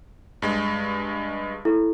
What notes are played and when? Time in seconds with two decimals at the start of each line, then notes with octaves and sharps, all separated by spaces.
0.42 G2 G#3
1.65 E4 A4